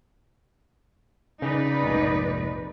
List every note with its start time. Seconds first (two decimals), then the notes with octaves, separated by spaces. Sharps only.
1.42 C#3 D#4 B4 D5
1.83 F1 A#1 G#2